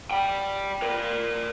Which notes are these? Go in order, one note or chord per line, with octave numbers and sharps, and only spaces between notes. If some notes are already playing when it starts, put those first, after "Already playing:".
D5 G5
A#4 D5